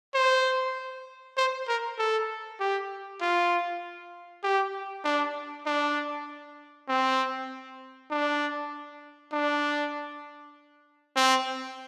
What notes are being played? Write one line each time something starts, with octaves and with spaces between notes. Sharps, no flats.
C5
C5
A#4
A4
G4
F4
G4
D4
D4
C4
D4
D4
C4